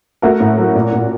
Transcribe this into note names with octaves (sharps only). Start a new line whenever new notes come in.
A3 F#4 A#4
A2
F#3
A#2
A#2